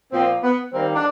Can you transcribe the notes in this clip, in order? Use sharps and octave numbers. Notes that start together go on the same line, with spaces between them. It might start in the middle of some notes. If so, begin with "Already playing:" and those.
A#2 F3 A#3 C4
B3
D#3 G3 A#3 C4
D4